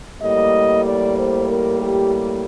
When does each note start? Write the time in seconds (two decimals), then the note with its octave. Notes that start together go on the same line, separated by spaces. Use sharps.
0.21 A2 G3 A#3 D#5
0.85 D5
1.17 C5
1.48 A#4
1.81 G4